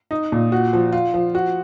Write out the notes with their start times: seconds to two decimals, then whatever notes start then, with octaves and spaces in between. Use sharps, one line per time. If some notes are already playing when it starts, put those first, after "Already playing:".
0.11 D#4
0.32 A#2
0.52 F#4
0.73 F3
0.93 F4
1.14 F3
1.35 F#4